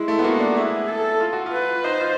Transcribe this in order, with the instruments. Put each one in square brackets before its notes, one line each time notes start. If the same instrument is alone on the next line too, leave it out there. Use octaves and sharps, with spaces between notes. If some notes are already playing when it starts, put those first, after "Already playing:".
Already playing: [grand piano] G#3 [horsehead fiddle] E4
[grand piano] A3
B3
[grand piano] A#3 [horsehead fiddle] F#4
[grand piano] D4
[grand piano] E4 [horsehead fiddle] G#4
[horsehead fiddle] A4
[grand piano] F4
F#4
F4
[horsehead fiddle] B4
[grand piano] D#4 [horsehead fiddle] C5
[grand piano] F4